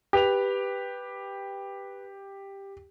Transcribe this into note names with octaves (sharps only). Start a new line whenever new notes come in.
G4 B4 F7